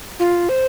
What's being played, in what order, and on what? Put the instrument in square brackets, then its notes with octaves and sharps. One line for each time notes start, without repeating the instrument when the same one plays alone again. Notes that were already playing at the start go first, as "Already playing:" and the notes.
[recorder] F4
C5